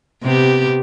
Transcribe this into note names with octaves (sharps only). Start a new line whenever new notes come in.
C3 B3 G4